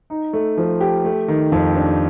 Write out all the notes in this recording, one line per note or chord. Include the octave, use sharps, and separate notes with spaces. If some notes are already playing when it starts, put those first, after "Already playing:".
D#4
A3
F3
G4
A3
D#3
F2
D4